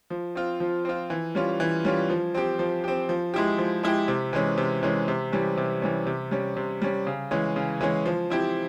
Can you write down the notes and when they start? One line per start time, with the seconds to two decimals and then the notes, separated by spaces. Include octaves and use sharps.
0.10 F3
0.35 C4 F4
0.60 F3
0.85 C4 F4
1.10 E3
1.35 G3 C#4 F4
1.60 E3
1.85 G3 C#4 F4
2.10 F3
2.34 C4 G4
2.59 F3
2.84 C4 G4
3.09 F3
3.34 G#3 E4 G4
3.58 F3
3.83 G#3 E4 G4
4.08 C3
4.33 E3 G#3 C#4
4.57 C3
4.83 E3 G#3 C#4
5.08 C3
5.32 E3 G3 C#4
5.57 C3
5.82 E3 G3 C#4
6.06 C3
6.31 G3 C#4
6.57 C3
6.82 G3 C#4
7.07 C#3
7.31 E3 G#3 C#4
7.56 C#3
7.81 E3 G#3 C#4
8.06 F3
8.30 C4 E4 G4